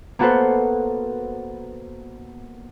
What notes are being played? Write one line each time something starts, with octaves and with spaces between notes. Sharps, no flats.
A#3 B3 F#4 A4 B4 C5